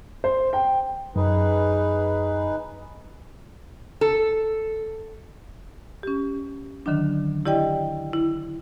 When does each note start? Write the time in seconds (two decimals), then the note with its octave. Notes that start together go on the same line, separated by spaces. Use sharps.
0.24 C5
0.53 G5
1.16 F#2 D#4 G#4 B4
4.01 A4
6.03 C#4 G4
6.86 D3 D#3 F#3 D4
7.46 E4 G4 D5 D#5 G5
8.13 E4